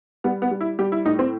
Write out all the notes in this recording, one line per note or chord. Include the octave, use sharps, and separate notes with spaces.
G3 B3
B3
G3
E4
G3 G4
E4
A2 D#4
C4